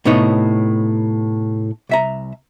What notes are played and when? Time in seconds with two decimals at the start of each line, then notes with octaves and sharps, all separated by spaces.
0.05 A2 C3 B3 D#4 C#5
1.89 C2 E5 A#5